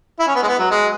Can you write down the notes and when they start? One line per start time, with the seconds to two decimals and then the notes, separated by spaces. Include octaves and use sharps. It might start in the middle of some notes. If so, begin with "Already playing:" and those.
0.19 E4
0.27 C#4
0.35 B3
0.43 G#3
0.47 B3
0.59 F#3
0.71 G#3